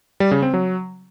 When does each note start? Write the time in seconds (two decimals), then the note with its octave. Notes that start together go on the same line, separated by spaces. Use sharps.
0.20 G3
0.31 C#3
0.42 C4
0.54 F#3